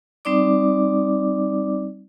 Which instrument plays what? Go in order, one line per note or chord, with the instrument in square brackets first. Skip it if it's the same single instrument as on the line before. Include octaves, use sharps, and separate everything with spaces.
[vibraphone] G3 C4 D#4 D5 D6